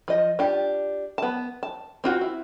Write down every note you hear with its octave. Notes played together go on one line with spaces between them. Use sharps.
F3 D#5
D4 F4 G4
B3 A5
A5
C4 F4 F#4
E4